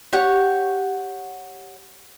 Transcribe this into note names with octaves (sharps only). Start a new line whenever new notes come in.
G4 C#5 F#5